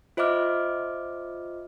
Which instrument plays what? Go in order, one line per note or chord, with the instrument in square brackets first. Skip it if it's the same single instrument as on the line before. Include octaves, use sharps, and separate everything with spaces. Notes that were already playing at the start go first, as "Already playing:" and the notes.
[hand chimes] F4 C5 D#5 E5 D6 F6